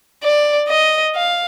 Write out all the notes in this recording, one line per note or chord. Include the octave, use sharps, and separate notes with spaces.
D5
D#5
F5